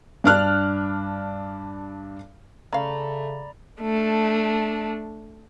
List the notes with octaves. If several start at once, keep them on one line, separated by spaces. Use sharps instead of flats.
G2 D4 D5 F6 F#6
C#3 A3 C#4 D5 F5 A#5 B5
A3 D4